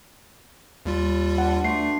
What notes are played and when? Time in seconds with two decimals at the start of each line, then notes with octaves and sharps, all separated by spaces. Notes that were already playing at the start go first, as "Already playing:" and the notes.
0.86 D#2 G3 F4
1.38 D3 B4 F#5 A5
1.65 A3 D4 F#4 C6 C7